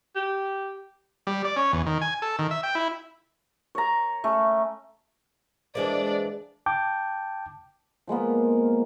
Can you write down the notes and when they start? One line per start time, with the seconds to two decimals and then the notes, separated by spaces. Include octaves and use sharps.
0.16 G4
1.27 G3
1.45 D5
1.56 C#4
1.73 E2
1.86 D#3
2.02 G#5
2.22 A4
2.39 D#3
2.51 E5
2.63 G5
2.75 E4
3.75 C#5 A#5
4.24 A3 C#4
5.75 E3 G#3 A#3 D4 G#4 C5 D5
6.66 G5 A5 D6 G6
8.07 F3 G#3 A#3 B3